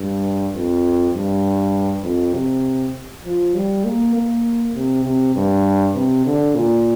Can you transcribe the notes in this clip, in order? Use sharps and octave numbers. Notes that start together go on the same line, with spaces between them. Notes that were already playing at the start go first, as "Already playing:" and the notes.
Already playing: G2
F2
G2
F2
C3
F3
G3
A#3
A#3
C3
C3
G2
C3
D3
A#2